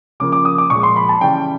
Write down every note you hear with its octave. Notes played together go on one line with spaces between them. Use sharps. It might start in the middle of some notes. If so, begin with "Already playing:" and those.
C#3 F3 A#3 D6
D6
D#6
D6
A#2 F3 G#3 C#6
C6
B5
A5
C#3 E3 G3 G5